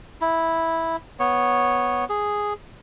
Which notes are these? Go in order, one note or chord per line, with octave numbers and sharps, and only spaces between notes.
E4
B3 C#5
G#4